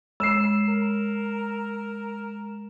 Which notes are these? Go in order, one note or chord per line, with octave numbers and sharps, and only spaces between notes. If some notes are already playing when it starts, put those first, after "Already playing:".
G#3 E6 C7 E7
A#4